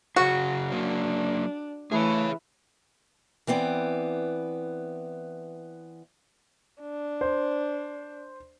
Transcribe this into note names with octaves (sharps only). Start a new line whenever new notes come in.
C#3 F#3 F#4 G#4
F#3 A#3 D4
E3 A3 G#4 C#5
E3 B3 C4 D5
D4
C5